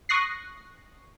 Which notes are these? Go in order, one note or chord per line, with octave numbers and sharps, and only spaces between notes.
C#6 D#6 F#6 A#6 C7